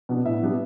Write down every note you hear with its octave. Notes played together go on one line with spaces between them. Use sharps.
B2 B3 D4
A2 E5
G3 B3 D4